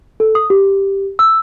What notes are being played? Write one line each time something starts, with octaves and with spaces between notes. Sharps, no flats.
A4
D#6
G4
E6